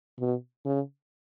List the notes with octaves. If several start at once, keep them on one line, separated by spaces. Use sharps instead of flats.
B2
C#3